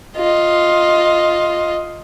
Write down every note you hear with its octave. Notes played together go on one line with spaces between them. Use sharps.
F4 D#5